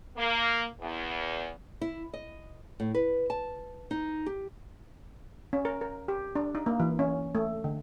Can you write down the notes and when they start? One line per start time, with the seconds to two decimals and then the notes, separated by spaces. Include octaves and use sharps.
0.17 A#3
0.80 E2
1.81 E4
2.14 D#5
2.80 A2
2.95 B4
3.30 A5
3.91 D#4
4.26 G4
5.53 C#4
5.65 A#4
5.81 A#4
6.08 G4
6.35 D4
6.55 D#4
6.66 A#3
6.80 E3
6.99 C#4
7.35 A3
7.64 D3